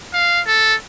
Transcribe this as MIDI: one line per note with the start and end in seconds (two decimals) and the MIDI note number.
0.14 0.41 77
0.47 0.74 69